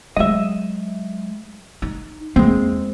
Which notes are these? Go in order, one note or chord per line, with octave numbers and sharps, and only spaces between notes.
F#3 G#3 D#5 E5
D#4
E2 G#3 A#3 C4